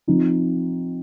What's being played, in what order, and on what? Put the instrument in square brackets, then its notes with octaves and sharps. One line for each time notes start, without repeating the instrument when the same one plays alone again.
[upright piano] F3 C4 D#4